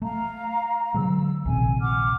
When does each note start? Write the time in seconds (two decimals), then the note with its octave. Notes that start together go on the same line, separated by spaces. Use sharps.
0.02 A3 F5 A#5
0.94 D3 F#3 G#3 E6
1.45 A#1 D#2 C3 G#5
1.80 F#5 D6 F6